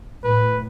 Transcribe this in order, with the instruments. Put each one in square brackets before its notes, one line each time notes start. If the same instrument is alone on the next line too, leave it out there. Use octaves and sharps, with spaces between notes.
[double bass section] A2 [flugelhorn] B4